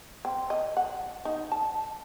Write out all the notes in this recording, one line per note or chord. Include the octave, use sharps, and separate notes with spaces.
C4
D#5
F#5
D#4
A5